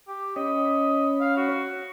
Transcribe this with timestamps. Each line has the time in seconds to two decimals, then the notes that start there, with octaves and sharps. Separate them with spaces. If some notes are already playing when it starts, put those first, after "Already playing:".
0.08 G4
0.36 C#4 C#5 D#5 B5
1.21 F5
1.37 F#4